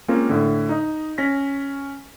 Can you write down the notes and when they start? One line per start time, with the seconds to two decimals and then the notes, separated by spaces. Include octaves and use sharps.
0.08 G#3 A#3 C4 C#4 F4 A#4
0.29 A2 D3
0.69 D#4 D#5
1.18 C#4 A#6 B6